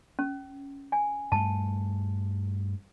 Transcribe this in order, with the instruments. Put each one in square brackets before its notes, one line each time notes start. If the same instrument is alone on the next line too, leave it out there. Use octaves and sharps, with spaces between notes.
[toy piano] C#4
G#5
[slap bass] G2 A3 [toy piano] A5